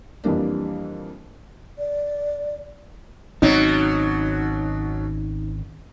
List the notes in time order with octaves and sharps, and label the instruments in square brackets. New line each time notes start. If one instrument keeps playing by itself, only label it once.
[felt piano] F2 E3 G3 A#3 D4
[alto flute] D5
[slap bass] G#1 C4 C#4 [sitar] B2 F#3 [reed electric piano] D#4